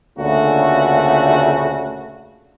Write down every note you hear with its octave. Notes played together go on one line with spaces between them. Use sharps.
D2 A#2 C#3 A3 F#4